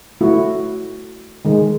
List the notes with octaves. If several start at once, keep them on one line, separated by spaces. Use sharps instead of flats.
A3 E4 F#4
D#3 G#3